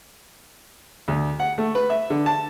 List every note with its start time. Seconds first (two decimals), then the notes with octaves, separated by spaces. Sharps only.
1.08 D2
1.40 F#5
1.58 A3
1.75 B4
1.90 E5
2.10 D3
2.26 A5